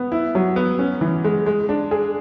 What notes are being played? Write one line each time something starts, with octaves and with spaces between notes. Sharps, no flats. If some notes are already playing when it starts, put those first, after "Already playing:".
Already playing: B3
E4
F#3
B3
C#4
E3
G#3
G#3
D4
G#4